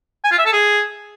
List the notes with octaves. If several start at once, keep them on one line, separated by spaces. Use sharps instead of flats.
G#5
F4
E5
A4
G#4